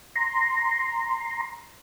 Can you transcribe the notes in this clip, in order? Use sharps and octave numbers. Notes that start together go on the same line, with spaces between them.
A#5 C6